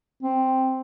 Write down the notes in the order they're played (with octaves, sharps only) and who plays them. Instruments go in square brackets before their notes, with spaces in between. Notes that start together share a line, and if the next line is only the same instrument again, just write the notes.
[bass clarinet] C4